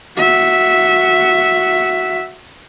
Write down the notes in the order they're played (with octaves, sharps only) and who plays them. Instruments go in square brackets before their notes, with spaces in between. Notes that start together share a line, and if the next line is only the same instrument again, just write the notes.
[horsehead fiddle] F#4 E5